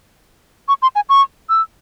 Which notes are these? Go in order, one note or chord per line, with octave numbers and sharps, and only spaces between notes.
C#6
C6
G#5
C#6
E6